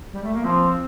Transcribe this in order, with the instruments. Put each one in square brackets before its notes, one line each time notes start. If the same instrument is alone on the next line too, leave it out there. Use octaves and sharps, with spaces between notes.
[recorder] G3
A3
A#3
[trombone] F3 [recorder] C4